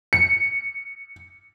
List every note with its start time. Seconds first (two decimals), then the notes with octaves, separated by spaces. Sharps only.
0.13 C#7